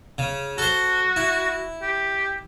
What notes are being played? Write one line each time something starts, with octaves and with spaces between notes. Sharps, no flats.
C#3
F#4 A4 C5
E4
G4